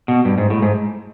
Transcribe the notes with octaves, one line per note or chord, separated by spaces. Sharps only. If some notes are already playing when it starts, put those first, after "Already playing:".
B2
G2
G#2
A2
G#2